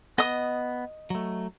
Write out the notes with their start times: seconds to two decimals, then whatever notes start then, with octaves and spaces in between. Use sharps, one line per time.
0.18 B3 D#5 D#6
1.10 F#3 A3